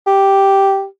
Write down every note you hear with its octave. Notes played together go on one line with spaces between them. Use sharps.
G4